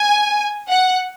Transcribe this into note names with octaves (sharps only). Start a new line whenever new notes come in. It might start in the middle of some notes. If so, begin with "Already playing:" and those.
Already playing: G#5
F#5